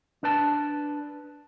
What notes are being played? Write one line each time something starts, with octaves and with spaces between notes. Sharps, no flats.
D4 B4 A5